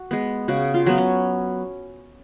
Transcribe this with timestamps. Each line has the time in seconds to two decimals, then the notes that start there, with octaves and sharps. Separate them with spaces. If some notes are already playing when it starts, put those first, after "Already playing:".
Already playing: F#4
0.11 G#3 B3
0.48 C#3 F#4
0.74 F4
0.86 F#3 B3
0.98 C#4